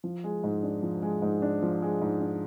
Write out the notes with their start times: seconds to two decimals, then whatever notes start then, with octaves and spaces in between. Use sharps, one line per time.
0.04 F3
0.24 G#3
0.44 G#2
0.63 D4
0.83 F3
1.02 G#3
1.22 G#2
1.42 D4
1.62 F3
1.82 G#3
2.02 G#2
2.21 D4